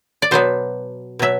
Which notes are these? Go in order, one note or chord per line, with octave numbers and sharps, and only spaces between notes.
D5
B2 F#3 B3 C5
B2 F#3 E5